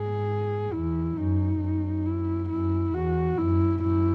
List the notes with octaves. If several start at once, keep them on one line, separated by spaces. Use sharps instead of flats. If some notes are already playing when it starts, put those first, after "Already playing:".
Already playing: G#2 G#4
E2 E4
F#2 D#4
F#2
E4
F#2 E4
E2 F#4
F#2 E4
F#2 E4